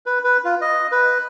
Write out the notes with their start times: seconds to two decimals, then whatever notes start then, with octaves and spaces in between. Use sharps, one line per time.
0.06 B4
0.24 B4
0.44 F4
0.61 D#5
0.92 B4